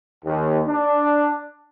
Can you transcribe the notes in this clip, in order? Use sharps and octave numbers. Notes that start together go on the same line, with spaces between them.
D#2
D4